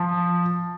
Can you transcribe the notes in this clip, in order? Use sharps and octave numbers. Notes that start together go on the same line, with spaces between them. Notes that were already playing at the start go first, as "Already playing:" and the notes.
Already playing: F3